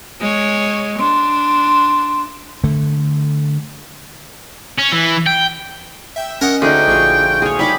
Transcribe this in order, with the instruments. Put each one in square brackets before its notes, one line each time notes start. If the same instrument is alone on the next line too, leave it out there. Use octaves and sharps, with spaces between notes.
[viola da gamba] G#3 C#5
[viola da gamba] D4 [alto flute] C6
[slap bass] D3 A3
[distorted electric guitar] C#4
E3
G5
[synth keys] E5 G5
[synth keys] C#4 D#5 [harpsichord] A#4 F#5
[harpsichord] D2 [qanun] D#4 G#4 [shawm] G5
[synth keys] A#1 C#6 [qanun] F4 G#4
[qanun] G#4 C#5
[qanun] G3 G#4 D6 [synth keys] D#4 G4 C#5 [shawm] B5